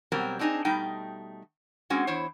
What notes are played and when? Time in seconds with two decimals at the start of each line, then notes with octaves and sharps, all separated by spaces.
0.12 B2 F#3 G3 C4 A#4
0.39 C4 D4 D#4 F#4 G#4
0.65 B2 G3 A3 D#4 G5
1.90 G#3 C4 C#4 F#4
2.07 E2 E4 C5 C#5